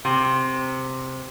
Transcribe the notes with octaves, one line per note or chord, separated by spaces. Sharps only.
C3